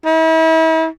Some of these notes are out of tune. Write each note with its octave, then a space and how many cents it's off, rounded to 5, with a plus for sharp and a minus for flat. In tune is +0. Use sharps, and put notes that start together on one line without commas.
E4 -40